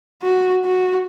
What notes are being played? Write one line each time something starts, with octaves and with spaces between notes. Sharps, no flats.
F#4
F#4